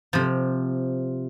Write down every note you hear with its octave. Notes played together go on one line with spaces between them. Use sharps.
C3 F3